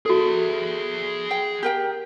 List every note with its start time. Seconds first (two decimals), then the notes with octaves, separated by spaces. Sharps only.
0.06 F#4 G#4 A4 E5
1.31 G5
1.63 G4 A#4 G5